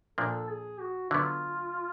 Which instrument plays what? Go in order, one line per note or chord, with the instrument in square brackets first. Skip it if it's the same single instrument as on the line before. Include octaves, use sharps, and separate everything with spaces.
[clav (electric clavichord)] A#2 F3 A#3 D4 [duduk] A4
[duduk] G#4
F#4
[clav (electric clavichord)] D3 F#3 B3 [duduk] F4